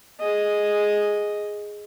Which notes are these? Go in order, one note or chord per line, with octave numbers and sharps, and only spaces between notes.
G#4 D#5